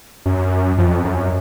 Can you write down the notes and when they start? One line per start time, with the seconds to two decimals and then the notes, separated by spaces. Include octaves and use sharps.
0.26 F#2
0.78 F2
1.05 F#2